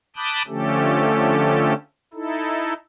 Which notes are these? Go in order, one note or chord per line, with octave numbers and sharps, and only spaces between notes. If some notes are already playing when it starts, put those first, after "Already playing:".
A5 B5 D6 D#6 F#6 G6
D3 F3 A3 C#4 G4 A4
D#4 E4 A4